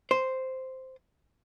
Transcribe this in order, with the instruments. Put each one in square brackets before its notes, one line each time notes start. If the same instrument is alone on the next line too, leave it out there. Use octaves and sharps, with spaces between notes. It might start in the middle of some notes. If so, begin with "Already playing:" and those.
[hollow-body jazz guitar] C5